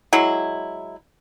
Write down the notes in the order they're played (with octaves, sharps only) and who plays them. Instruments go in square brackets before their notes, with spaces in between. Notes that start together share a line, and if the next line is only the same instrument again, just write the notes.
[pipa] F#3 G#3 E4